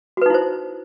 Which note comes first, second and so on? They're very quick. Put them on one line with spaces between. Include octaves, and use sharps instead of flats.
F#4 B4 D#4 E4 C5